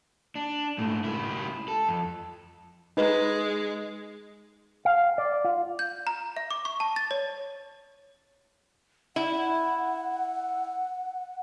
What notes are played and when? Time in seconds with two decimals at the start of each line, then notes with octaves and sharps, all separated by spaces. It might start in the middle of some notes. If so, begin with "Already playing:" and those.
0.35 D4
0.79 G#2 A3
1.04 C#2 E4
1.68 A4
1.89 F2
2.97 G#3 D#4 B4
4.85 F5
5.18 D5
5.45 F4
5.79 G6
6.07 A#5
6.36 E5
6.51 D6
6.65 C#6
6.80 A5
6.96 A6
7.11 C#5
9.16 E4 F#5